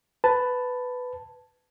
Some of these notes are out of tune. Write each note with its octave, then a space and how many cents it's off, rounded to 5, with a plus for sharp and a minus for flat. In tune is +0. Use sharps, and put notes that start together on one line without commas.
B4 +10 A5 +0